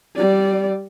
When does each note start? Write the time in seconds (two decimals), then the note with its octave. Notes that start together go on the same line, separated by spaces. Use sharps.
0.16 G3 D5